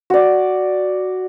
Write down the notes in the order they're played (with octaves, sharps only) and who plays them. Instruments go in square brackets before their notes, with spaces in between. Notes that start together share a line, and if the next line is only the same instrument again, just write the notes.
[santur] F#4 D5